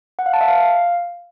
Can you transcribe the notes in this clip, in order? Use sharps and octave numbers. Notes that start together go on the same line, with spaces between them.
F#5
F5
A5
E5
F5